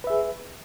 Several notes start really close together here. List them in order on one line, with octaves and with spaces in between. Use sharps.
B4 E5 G#4